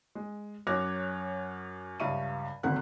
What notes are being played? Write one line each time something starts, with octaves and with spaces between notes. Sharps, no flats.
G#3
F#2 C#5 D6 F6 F#6 A#6
C#2 G2 E5 F5 C#6 D#7
D#1 G#1 D2 F#5 F#6